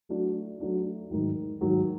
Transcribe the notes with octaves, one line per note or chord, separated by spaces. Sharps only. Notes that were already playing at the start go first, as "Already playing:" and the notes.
F#3 A3 D4 F#4
F#3 A3 D4 F#4
G#2 D#3 F#3
G#2 D#3 F#3